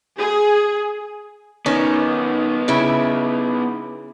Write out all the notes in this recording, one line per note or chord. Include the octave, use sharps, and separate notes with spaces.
G#4
D#3 B3 C#4 D#4
C#3 E4